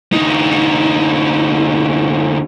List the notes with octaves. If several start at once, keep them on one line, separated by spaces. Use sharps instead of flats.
D2 D#4